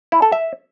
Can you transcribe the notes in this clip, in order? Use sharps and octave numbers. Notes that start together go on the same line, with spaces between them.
E4
A4
E5